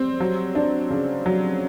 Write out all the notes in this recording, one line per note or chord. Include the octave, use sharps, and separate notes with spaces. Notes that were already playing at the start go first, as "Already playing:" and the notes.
Already playing: G3 C4
F#3
D4
C#3
F#3